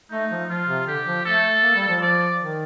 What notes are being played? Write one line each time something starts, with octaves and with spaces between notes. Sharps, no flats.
A3 D#4
F3
F3 F4
C3
D3 G4
F3
A3 A4
A#3
G3
F3
F3 D5
D#3